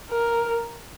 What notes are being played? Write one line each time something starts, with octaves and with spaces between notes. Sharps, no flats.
A#4